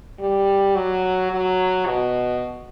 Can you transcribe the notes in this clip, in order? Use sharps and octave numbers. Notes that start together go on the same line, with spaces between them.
G3
F#3
F#3
B2